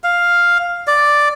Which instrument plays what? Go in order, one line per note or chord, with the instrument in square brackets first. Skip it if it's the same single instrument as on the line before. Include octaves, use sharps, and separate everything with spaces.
[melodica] F5
D5